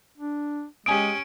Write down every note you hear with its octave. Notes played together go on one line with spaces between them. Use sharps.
D4
G#3 C#4 G4 G#5 D#6 D7